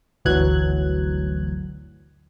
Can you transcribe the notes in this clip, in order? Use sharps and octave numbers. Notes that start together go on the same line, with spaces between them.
G1 D2 E3 F#3 F#6 G#6